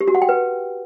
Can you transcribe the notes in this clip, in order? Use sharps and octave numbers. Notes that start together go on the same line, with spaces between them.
G4
F#4
F#5
G5
B4